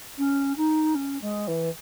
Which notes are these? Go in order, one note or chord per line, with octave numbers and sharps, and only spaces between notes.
C#4
D#4
C#4
G#3
E3